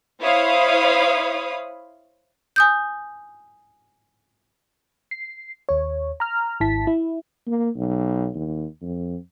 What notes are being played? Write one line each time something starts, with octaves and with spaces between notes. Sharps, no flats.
E4 C5 C#5 F5 B5 D#6
G#5 D#6 G6
C7
D#2 C#5
A#5 F6
G#1 E4 A5 B6
E4
A#3
B1
D#2
F2